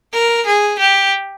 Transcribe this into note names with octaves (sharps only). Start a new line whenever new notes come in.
A#4
G#4
G4